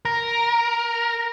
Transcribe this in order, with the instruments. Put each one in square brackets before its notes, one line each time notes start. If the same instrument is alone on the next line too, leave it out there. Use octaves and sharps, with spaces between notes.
[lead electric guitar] A#4